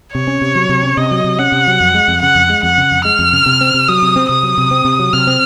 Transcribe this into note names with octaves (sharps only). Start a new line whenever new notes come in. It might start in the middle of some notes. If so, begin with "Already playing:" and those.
C3 C#5
C#4
C3
F#3
C3
C#4
C3 D#5
F#3
C3
C#4 F#5
C3
F#3
F2
G#3
F2
C#3 F#5
F2
G#3
F2 F#5
C#3
F2
G#3 F6
F2
C#3
C3
C4
C3
F#3 D#6
C3
C4
C3 D#6
F#3
C3
C4
C3
F#3
C3 F6
C4